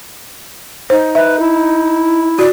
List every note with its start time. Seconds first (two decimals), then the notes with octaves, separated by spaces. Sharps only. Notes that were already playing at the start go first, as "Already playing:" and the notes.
0.90 D#4 C5
1.15 B4 E5
1.39 E4
2.39 F#4 D5